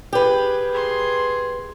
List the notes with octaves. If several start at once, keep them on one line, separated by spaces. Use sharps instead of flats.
G4 G#4 B4
G#4 C6